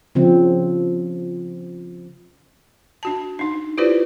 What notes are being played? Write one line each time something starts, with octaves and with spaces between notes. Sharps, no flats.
C#3 F3 C4
D4 F#4 A5
D4 D#4
E4 F4 G4 B4 C5 D5